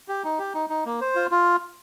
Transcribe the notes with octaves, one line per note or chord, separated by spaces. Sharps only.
G4
D#4
G4
D#4
D#4
A#3
C5
F4
F4